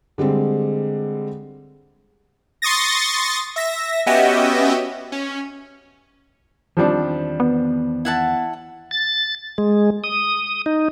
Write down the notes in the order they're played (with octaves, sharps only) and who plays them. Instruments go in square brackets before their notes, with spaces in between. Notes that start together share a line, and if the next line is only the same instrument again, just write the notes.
[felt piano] D3 G3 G#3 C4
[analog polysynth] C6 C#6 D#6 A6 A#6
E5 A#6
B3 C#4 F#4 G4 D#5 E5
C#4
[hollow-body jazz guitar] E2 D#3 C4 [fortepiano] F3 G3 D4
[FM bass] B3
[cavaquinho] E4 F#5 A5
[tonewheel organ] A6
G#3
D#6
D#4